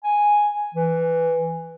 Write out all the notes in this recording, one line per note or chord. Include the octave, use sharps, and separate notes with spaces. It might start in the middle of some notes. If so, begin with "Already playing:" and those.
G#5
E3